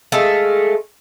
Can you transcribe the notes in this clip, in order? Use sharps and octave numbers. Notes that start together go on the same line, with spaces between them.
G#3 A3 A4 F5